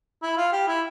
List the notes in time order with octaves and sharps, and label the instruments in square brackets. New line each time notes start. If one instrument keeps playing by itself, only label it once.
[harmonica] E4
F4
G4
E4